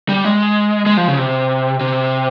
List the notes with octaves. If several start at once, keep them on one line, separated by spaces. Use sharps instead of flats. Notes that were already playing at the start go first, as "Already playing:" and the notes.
G3
G#3
G#3
F3
C#3
C3
C3